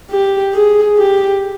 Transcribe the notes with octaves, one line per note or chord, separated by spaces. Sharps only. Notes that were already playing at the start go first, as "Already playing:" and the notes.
G4
G#4
G4